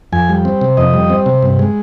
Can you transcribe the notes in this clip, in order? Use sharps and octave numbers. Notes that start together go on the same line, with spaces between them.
F2 G#5
G3
C4
C3
F2 D#5
G3
C4
C3
G2
G#3